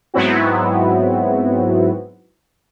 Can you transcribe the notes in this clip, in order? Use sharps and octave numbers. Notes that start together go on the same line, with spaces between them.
G#2 F#3 B3 C4 E4 F#4